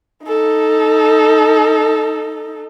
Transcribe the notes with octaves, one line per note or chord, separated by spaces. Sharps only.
D#4 A4